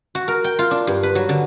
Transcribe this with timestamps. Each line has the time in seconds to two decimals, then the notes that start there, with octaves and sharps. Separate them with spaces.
0.15 F#4
0.28 A#4
0.44 G5
0.59 F4
0.71 D4
0.87 G2
1.03 B4
1.15 F#3
1.29 D3